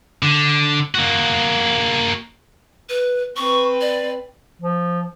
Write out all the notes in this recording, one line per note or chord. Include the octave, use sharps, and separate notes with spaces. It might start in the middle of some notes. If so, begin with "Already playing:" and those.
D3
A#3 F#4
B4
C4 B4 C#6
D5
F3